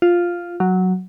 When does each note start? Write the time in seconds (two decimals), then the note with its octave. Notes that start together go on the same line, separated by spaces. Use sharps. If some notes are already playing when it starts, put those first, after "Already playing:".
0.02 F4
0.60 F#3